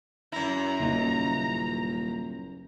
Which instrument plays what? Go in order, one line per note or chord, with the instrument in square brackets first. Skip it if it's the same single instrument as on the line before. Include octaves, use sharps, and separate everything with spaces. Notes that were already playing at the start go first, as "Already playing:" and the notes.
[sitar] F#2 E4 [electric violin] A#5
[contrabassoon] D#1 [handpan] C#3 A#3 D#4